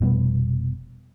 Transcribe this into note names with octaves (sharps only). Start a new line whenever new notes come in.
F1 B2 G3 B3